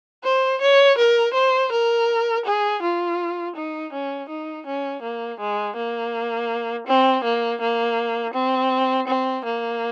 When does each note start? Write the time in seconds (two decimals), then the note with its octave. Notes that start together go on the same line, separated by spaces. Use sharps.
0.24 C5
0.61 C#5
0.98 A#4
1.34 C5
1.72 A#4
2.46 G#4
2.82 F4
3.56 D#4
3.93 C#4
4.29 D#4
4.67 C#4
5.02 A#3
5.40 G#3
5.77 A#3
6.87 C4
7.24 A#3
7.61 A#3
8.34 C4
9.08 C4
9.45 A#3